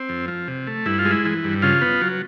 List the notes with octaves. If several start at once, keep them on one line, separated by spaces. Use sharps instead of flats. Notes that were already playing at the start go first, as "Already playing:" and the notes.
Already playing: C4
F2
F3
C3
A3
G2 E4
F4
G#3
E4
E3
G2
C#3 F4
B3
F#3